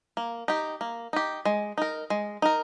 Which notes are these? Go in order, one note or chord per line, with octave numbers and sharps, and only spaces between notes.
A#3
D#4 G4
A#3
D#4 G4
G#3
D#4 A#4
G#3
D#4 A#4